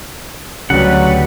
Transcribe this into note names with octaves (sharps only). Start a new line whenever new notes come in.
D2 C#3 F#3 G3 B4 F#5